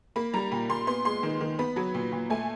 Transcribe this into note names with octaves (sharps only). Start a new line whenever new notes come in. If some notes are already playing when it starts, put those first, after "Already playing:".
A#3 B5
G3 A#5
A#2 B5
A#2 C6
B3 C6
G#3 C6
D#3
D#3
B3 B5
F#3
A#2
A#2
A3 G#5